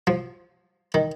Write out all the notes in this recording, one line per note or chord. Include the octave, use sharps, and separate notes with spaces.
F3
D#3